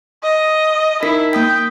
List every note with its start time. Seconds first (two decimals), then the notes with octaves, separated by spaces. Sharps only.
0.23 D#5
1.03 D#4 E4 A#4 B6
1.33 A#3 G5 D#6 B6